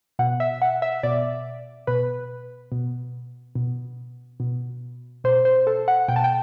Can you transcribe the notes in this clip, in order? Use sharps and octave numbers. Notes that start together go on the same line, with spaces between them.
B2 F#5
E5
F#5
E5
B2 D5
B2 B4
B2
B2
B2
B2 C5
C5
A4
F#5
B2 G5
A5
G5